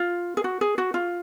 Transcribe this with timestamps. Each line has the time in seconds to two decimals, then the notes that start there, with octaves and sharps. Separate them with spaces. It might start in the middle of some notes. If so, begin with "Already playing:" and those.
Already playing: F4
0.37 G#4
0.44 F#4
0.61 G#4
0.78 F#4
0.94 F4